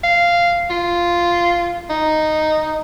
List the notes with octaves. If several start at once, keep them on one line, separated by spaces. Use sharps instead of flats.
F5
F4
D#4